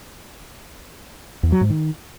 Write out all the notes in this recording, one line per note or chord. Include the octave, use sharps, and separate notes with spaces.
E2
F#3
G#2
D#3